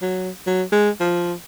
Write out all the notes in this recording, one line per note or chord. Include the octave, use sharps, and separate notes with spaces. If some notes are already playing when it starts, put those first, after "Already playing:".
F#3
F#3
G#3
F3